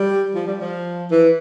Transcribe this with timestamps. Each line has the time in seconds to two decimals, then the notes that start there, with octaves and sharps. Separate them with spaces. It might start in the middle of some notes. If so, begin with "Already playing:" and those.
Already playing: G3
0.34 F3
0.47 G3
0.61 F3
1.11 E3